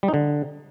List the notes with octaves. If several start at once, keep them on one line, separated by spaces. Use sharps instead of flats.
G3
D#4
D3